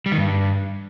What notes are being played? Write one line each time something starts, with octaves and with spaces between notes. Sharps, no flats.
G3
D#3
G2